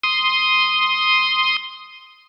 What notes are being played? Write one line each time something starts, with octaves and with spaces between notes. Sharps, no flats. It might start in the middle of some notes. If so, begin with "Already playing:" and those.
C6 D#6